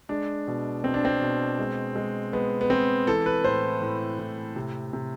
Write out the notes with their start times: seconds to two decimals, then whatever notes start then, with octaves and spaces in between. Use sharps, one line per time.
0.09 G#3 D4
0.48 B2
0.84 B2 C4
0.94 D4
1.05 C4
1.22 B2
1.58 G#3
1.96 G#3
2.33 G#3 B3
2.61 B3
2.70 G#3 C4
3.07 E3 A4
3.26 B4
3.44 A2 C5
3.82 A2
4.19 A2
4.56 C3
4.93 C3